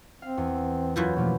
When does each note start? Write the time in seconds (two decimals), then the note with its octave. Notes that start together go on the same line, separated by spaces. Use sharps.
0.22 C4 F5
0.37 E2
0.96 F#2 E3 E4 F4 G6
1.16 B2 F3 A3 A#3